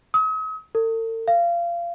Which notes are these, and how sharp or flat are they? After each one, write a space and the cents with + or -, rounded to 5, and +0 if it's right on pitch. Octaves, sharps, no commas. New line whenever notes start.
D#6 +45
A4 +45
F5 -25